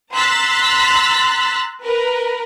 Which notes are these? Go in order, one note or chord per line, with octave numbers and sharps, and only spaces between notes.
A#5 C6 E6 F#6 A6 B6
A#4 B4